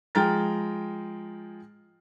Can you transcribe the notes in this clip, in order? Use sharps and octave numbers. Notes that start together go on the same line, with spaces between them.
F3 G#3 G5 A#5 F6 A6